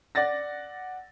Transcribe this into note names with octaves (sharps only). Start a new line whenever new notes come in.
D5 F#5 A6 A#6